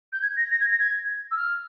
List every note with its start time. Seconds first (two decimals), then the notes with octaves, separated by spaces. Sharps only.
0.13 G6
0.22 G#6
0.36 A#6
0.51 A#6
0.60 G#6
0.70 A#6
0.79 G#6
1.31 E6
1.36 F6